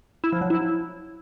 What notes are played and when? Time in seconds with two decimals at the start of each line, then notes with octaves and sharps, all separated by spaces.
0.24 E4
0.33 F3
0.41 F#3
0.50 E4